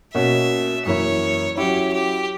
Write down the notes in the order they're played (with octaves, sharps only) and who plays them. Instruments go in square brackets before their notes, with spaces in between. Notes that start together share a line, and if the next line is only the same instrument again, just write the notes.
[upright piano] B2 A#3 C#4 [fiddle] E5
[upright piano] F#2 E3 A#3 E4 [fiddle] C#5
[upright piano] F#3 C#4 E4 [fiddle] G4
[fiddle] G4